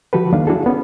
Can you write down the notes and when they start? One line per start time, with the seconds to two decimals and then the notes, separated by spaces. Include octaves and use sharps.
0.13 D3 F3 F#4 G4 A4 B4
0.33 D#3 F#3 A#3 D4 F5
0.47 D4 E4 F#4 G#4 A4
0.66 B3 C#4